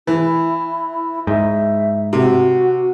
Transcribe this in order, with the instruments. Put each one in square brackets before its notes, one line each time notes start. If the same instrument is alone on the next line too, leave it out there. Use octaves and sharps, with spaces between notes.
[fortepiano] E3 [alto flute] E4
[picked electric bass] G#2 [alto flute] E5
[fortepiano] C3 [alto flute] F#4